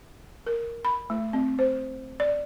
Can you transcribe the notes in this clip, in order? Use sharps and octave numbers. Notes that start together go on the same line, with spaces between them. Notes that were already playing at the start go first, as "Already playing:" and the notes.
A#4
B5
A3
C4
C5
D5